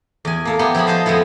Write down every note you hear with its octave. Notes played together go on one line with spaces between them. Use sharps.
E2 G#5
A#3 A4 F5
B3 E4 G4 A#4
F3 E4 G#4 D#5 B5
C5 D#5 F5 A5
F2 F3 G#3 B3 E4